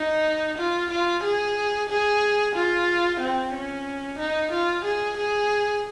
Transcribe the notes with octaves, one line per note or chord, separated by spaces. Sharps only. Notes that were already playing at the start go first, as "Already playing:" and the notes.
Already playing: D#4
F4
F4
G#4
G#4
F4
C4
C#4
D#4
F4
G#4
G#4